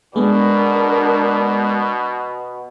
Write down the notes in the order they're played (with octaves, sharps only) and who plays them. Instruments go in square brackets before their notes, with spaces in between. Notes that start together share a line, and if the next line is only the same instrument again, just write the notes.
[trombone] B2 [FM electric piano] G#3 B3 [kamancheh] D4 A#4